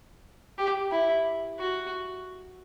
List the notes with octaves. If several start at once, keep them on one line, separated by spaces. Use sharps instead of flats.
G4
E4
F#4